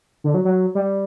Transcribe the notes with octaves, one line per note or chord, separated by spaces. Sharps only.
D3
F#3
F#3
G3